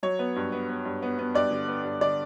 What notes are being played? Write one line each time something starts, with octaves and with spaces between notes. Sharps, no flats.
F#3 C#5
B3
G2
B3
B3
G2
B3
B3
G2 D5
D3
B3
G2
D3 D5